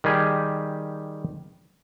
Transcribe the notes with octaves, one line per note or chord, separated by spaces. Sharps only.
D#3 G3 G4 G#4